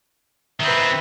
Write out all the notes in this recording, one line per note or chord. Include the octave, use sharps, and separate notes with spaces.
D#3 C4 B4 E5